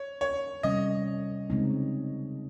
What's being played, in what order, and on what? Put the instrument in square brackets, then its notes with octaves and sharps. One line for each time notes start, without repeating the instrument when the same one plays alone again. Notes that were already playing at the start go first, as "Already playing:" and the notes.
Already playing: [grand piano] C#5
C#5
[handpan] C3 G3 C#4 [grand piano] D#5
[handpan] C#3 G#3 C4 D#4